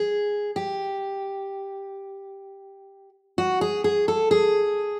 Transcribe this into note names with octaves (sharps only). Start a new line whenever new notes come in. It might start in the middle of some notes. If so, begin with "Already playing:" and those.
Already playing: G#4
G4
F#4
G#4
G#4
A4
G#4